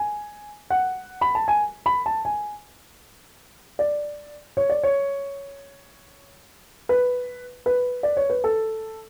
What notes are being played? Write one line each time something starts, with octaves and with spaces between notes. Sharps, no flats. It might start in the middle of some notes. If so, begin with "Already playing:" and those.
Already playing: G#5
F#5
B5
A5
G#5
B5
A5
G#5
D5
C#5
D5
C#5
B4
B4
D5
C#5
B4
A4